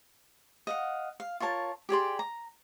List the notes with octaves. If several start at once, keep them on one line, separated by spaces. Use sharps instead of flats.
D#5 F5 F#5
F5
F4 A#4 C#5 A5
G4 G#4 D5 C6
A#5